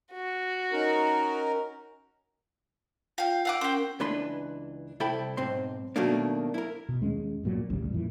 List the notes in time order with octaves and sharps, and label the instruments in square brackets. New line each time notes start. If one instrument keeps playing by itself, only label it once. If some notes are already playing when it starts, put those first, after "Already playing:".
[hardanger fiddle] F#4
[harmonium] C#4 D#4 A#4
[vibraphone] F4 [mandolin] F5 G5
[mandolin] F5 F#5 D6 [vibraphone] E6
[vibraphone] C#4 A#4 [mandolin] C5 G5
[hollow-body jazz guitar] C#2 E3 D4 B4 C6
C2 E4 A4 E5 G5 B5
B1 G#2 C4 C6
B2 D#3 F#3 A3 A#3 D4
E4 A#4
[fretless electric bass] B2
D#2 G#3 A#3 C#4
G2 A#2 F#3
A1 D2 C#3 G3
F2 A#2 E3